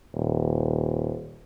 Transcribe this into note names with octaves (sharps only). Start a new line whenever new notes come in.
D#1